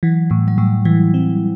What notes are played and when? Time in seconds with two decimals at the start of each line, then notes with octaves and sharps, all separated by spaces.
0.03 E3 F#3
0.30 A2 G3
0.48 F#3
0.58 A2 G3
0.85 E3 E4
1.14 C4